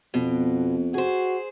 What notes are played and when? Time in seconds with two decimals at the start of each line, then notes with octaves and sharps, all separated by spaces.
0.14 F2 B2
0.94 F#4 G#4 C5